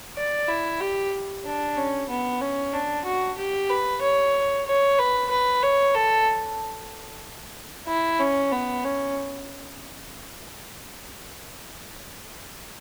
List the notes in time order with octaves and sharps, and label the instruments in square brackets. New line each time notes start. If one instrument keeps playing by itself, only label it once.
[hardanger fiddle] D5
E4
G4
D4
C#4
B3
C#4
D4
F#4
G4
B4
C#5
C#5
B4
B4
C#5
A4
E4
C#4
B3
C#4